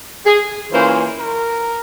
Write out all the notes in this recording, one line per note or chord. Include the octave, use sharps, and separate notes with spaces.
G#4
E3 A#3 C#4 F4 C5
A#4